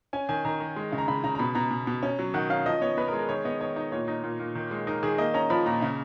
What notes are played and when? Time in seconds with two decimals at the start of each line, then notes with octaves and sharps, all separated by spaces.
0.13 C#4 G#5
0.29 D#3 G#5
0.45 D#3 A#5
0.60 D#3
0.76 G#3
0.92 C#3
0.98 A#5
1.08 C#3 B5
1.24 C#3 A#5
1.35 A#5
1.39 B2 B5
1.55 B2 A#5
1.71 B2
1.87 B2
2.03 C#4
2.19 F#3
2.34 D#3 F#5
2.50 C#4 F5
2.66 F3 D#5
2.81 B3 C#5
2.97 B3 B4
3.08 A#4
3.13 G#3
3.19 A#4
3.29 D#3 C#5
3.45 B3 D#5
3.61 D#3 C#5
3.76 D#4 D#5
3.92 A#2 C#5
4.08 D#4
4.24 A#2
4.40 A#2
4.55 D#3
4.71 G#3
4.87 D#4 A#4
5.03 D#3 G#4
5.18 A#3 D#5
5.34 C#4 A#5
5.50 F3 B5
5.66 A#2 A#5
5.82 C#3